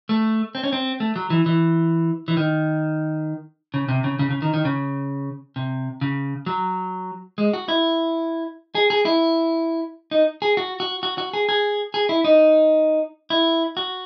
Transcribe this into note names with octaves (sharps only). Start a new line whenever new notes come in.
A3
C4
C#4
C4
A3
F#3
E3
E3
E3
D#3
C#3
C3
C#3
C#3
C#3
D#3
D#3
C#3
C3
C#3
F#3
G#3
F#4
E4
G#4
G#4
E4
D#4
G#4
F#4
F#4
F#4
F#4
G#4
G#4
G#4
E4
D#4
E4
F#4